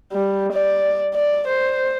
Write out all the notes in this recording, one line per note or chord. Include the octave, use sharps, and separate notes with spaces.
G3
D5
D5
C5